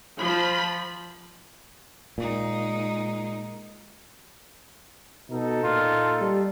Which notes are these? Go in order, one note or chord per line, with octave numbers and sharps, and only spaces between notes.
F3 B5
A#2 G#3 D#4
B2 D#4 A4
A#2 F4
G3